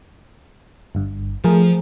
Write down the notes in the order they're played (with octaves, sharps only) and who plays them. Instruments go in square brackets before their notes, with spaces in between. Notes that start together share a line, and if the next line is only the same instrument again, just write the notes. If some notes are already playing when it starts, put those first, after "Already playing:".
[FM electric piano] G1 G2
[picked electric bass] F3 [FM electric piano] A3 G#4 A#4